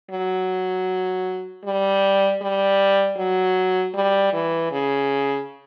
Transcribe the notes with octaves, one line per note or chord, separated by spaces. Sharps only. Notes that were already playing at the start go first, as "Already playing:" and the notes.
F#3
G3
G3
F#3
G3
E3
C#3